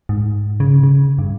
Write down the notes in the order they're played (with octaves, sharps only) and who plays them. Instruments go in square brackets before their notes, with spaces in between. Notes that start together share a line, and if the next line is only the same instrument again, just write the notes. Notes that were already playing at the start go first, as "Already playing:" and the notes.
[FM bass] G#2
C#3
C#3
G2